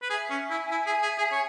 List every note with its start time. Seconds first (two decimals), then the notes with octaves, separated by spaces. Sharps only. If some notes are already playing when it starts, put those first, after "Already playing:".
0.02 B4
0.10 G#4 E5 G#5
0.30 C#4
0.50 E4
0.71 E4
0.86 G#4
1.02 G#4
1.18 G#4
1.32 C#5